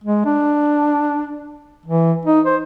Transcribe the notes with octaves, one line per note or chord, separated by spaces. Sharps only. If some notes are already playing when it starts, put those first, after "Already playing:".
G#3
D4
E3
D#4
C5